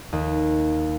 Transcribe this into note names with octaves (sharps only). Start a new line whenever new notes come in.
D#2